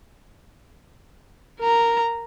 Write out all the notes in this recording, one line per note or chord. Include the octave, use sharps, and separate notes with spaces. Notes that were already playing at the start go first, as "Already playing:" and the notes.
A#4 A#5